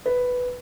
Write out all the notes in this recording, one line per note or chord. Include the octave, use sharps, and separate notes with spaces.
B4